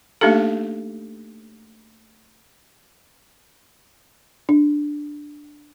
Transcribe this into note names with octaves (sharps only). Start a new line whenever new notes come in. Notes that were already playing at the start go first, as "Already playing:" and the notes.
A3 A#3 D4 D#4 G4 A4
D4